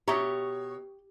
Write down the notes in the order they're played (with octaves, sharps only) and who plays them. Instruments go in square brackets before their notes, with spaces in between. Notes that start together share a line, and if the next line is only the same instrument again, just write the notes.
[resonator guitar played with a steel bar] B2 C#5 [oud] G4 [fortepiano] E5 A#5 C#6